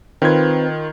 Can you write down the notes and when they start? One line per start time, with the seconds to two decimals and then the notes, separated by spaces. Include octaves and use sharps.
0.22 D#3 C4 F4 B4 G#6